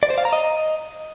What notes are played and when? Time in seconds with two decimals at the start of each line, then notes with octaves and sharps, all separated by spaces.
0.03 D5
0.10 C5
0.18 F5
0.25 A#5
0.33 D#5